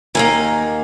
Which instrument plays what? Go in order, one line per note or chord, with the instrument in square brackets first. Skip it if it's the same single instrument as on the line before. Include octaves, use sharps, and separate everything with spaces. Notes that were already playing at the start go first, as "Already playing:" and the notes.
[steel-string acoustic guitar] D#2 D#3 A#3 G#5